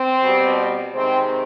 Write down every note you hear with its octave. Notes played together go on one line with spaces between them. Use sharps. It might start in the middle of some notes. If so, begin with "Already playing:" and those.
Already playing: C4
B2
G3
C3 D#3 G#3 C4